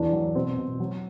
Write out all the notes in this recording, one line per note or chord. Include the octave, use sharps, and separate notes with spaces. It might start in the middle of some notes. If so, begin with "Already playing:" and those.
Already playing: E2 D4
F#3
B2 C4
B2
F#3